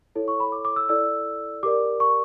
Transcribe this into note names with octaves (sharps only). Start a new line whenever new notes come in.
E4 A4 C#5
C#6
B5
D6
D6
E6
E4 A4 D5 E6
G4 A#4 D5 D6
C#6